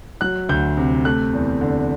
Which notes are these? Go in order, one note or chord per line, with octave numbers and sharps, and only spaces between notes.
F#3 F#6
D2 G6
C3
A3 F#6
E2
D3